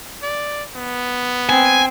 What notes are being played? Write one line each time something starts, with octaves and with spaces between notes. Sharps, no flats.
D5
B3
C4 G#5